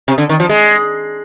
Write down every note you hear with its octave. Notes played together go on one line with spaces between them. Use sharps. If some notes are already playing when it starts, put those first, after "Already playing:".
C3
D3
D#3
F3
G#3